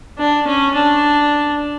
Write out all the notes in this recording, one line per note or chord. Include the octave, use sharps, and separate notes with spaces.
D4
C#4
D4